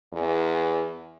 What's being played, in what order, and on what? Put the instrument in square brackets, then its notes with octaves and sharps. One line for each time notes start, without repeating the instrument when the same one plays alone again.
[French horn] E2